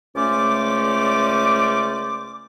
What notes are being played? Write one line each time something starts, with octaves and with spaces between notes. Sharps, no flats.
C#2 A3 C#4 C5 D5 D6